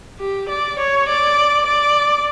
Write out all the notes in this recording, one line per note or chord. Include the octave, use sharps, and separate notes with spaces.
G4
D5
C#5
D5
D5